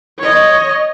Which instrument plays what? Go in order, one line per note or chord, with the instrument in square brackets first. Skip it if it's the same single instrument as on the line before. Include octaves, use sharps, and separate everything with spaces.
[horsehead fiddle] C#5 D#5